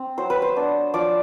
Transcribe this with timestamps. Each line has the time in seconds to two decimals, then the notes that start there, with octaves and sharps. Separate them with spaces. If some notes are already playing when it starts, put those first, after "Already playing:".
Already playing: C4
0.18 F#3 C5
0.30 B4
0.42 C5
0.56 B3 D4
0.94 F3 D5